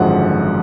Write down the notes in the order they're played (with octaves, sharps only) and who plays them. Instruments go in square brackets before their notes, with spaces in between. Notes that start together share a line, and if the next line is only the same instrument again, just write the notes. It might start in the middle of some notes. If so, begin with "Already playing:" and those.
Already playing: [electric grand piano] G#1 F#2 D3 F3 G#3 F#5